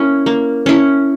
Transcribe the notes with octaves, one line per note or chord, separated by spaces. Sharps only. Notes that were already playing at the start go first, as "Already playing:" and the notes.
Already playing: A#3 C#4 E4
A#3
C#4 E4